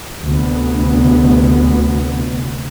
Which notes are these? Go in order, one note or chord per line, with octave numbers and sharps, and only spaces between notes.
D2 C3 B3